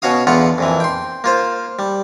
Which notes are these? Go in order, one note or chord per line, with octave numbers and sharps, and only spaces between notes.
B2 C#4 F#4 F5 D#6
E2 D3 B3 F4 F#5
F2 A#2 E3
G5 C6
A#3 F4 C5
G3